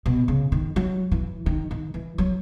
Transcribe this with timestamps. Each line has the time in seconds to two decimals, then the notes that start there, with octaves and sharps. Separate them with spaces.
0.06 B2
0.28 C#3
0.52 D#3
0.76 F#3
1.12 E3
1.46 D#3
1.71 D#3
1.94 E3
2.18 F#3